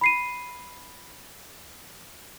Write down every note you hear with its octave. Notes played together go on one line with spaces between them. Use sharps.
B5 C7 D#7